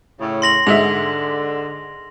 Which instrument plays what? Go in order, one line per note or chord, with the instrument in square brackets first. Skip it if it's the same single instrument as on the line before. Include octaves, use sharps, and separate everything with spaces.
[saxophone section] A2 C#3
[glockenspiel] C6 A#6 F#7
[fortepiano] G#2 G#3 E5 [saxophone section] D3 [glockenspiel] F7